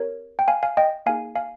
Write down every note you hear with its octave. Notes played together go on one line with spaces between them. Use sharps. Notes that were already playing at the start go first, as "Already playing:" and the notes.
Already playing: C4 G4 A#4 C#5
G5
F5 G#5
F5 G#5
D#5 G5
A#3 D#4 G#4 F5 G#5
F5 G#5